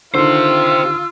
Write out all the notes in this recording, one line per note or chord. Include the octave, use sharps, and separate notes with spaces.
D3 D#3 F4 G4 C5 E6